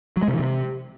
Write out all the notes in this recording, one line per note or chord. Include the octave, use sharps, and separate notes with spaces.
F#3
G#3
C3
E3
C3